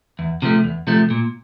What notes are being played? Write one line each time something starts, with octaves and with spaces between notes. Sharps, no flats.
E2
C3 F3 A3
E2
C3 F3 A3
A#2